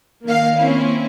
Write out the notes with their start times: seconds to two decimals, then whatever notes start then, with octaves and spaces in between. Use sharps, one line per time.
0.24 D#3 A#3 F5
0.60 A#3 C4 C#4 E4